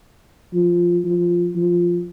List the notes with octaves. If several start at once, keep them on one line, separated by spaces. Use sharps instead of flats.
F3
F3
F3